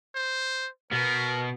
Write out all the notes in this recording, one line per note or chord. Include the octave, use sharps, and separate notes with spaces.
C5
B2 B3 A#4